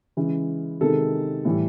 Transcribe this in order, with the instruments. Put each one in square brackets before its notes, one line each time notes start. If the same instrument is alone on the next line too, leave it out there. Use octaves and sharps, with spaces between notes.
[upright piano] C#3 E3 G#3
C3 D#3 G#3 A4
A2 E3 G3